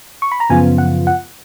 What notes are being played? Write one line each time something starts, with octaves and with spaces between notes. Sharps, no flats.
C#6
B5
A#5
F#2 C#3 F3 B3 F4 G#5
F#5
F#5